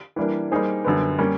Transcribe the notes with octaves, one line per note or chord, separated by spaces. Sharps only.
E3 G3 A#3 D4
G3 A#3 D#4 G#4 C5
F#2 D3 G3 B3
G3 A#3 C#4